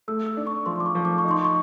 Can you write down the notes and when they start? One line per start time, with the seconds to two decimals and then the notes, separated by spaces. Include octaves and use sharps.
0.08 A3 E6
0.26 E6
0.37 D4
0.47 C#6
0.66 F3 C6
0.80 D6
0.86 C#6
0.95 F3
1.05 D6
1.18 C#6
1.25 D#4
1.31 C6
1.45 C#6